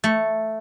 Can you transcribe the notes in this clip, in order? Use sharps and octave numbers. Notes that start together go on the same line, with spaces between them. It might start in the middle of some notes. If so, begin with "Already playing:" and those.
A3